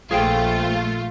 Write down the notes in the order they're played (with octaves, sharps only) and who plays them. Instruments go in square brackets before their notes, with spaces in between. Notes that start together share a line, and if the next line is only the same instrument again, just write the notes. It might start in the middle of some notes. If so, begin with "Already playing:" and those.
[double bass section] A#1 [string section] A3 F4 [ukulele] G#4 C5 G5